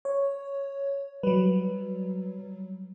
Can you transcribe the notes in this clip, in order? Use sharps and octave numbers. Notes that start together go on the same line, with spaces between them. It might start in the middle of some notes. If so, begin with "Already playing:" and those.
C#5
F#3 G3 B4